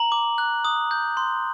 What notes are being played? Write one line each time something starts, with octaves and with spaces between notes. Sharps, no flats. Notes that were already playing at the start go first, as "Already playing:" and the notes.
Already playing: A#5 F#7
D6
F#6
D#6
G6
C6